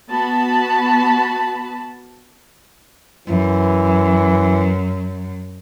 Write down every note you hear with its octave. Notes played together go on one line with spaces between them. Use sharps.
B3 F#4 A5 B5
F#2 E3